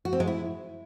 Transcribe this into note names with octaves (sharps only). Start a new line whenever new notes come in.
F#4
C4
G#3
E4